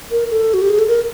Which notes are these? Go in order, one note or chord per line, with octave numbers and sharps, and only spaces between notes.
A#4
A4
F#4
G4
G#4
A4
A#4